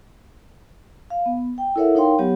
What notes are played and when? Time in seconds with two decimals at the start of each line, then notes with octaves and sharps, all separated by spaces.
1.10 F5
1.26 B3
1.58 G5
1.76 E4 A4 A#4 C#5 E5 F#5
1.95 D#4 A#4 C#5 F5 G5 C6
2.19 F#3 B3 G4 C#5 F#5